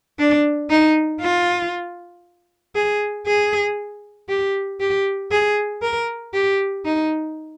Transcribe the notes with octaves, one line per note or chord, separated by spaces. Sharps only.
D4
D#4
F4
G#4
G#4
G4
G4
G#4
A#4
G4
D#4